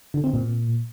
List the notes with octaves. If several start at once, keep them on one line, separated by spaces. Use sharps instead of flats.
D3
C4
A#2